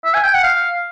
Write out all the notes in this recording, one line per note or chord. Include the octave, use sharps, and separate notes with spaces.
E5
G#5
G5
F#5
F5